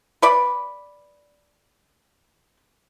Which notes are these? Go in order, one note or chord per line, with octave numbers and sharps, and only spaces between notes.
B4 D5 B5